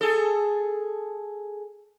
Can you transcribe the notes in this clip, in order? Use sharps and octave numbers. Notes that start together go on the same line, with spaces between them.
G#4 A4